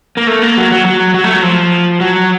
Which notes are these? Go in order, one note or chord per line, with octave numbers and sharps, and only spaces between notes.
A#3
A3
A#3
F#3
F#3
F#3
F#3
A3
F#3
F3
F#3